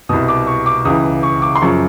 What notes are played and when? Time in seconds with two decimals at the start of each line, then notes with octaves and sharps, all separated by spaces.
0.09 B2 D#6
0.13 C2
0.28 D6
0.47 C#6
0.66 D6
0.85 C#2 C#3 E3 D#6
1.23 C#6
1.42 D6
1.55 C6
1.61 F#2 C#3 F3 C#6